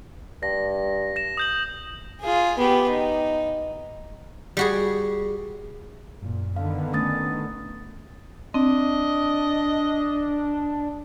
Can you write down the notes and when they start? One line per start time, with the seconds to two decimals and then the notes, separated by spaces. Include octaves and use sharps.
0.43 G2 A#6
1.16 A#6 E7
1.37 D#6 G6 F#7
2.20 F4 G#4
2.58 B3 G4
2.89 D#4
4.57 G3 F#4 G#4
6.21 F#2 A#2
6.56 D3 D#3 B3 F5
6.93 A3 C#4 D#6 A6
8.54 C4 D4 D#5